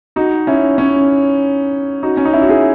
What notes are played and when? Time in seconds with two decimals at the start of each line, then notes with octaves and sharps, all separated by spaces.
0.16 D#4 F#4
0.47 C#4 E4
0.78 C#4
2.03 D#4 F#4
2.17 C#4
2.25 D#4
2.33 E4
2.42 F#4
2.49 E4 G#4